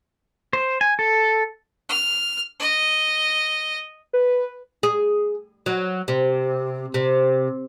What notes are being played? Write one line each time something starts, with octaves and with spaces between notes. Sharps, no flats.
C5
G#5
A4
F6
D#5
B4
G#4
F#3
C3
C3